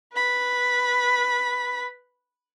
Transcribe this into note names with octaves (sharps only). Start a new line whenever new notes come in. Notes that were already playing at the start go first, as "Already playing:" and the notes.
B4 B5